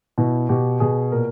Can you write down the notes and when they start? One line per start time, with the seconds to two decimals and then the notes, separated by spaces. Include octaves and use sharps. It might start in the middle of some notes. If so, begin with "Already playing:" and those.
0.18 B2 E4
0.49 B2 G4
0.80 B2 G#4
1.12 A#2 A#4